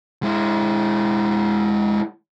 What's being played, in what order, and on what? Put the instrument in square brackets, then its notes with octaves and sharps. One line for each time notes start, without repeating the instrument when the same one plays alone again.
[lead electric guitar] G#3 E4